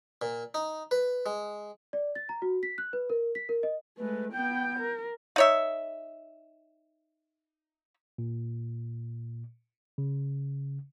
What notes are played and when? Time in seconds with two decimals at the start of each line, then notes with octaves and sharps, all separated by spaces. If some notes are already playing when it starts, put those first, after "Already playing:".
0.22 A#2
0.54 D#4
0.91 B4
1.26 G#3
1.93 D5
2.15 A6
2.29 A#5
2.42 F#4
2.63 B6
2.78 F#6
2.93 B4
3.10 A#4
3.35 B6
3.49 A#4
3.63 D#5
3.98 G#3 A3 B4
4.33 B3 G5 G6
4.78 A#4
5.36 D#4 C#5 E5
8.18 A#2
9.98 C#3